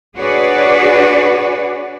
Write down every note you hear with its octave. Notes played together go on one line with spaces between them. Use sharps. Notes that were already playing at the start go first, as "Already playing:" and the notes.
D4 F#4 G#4 B4 C#5 D5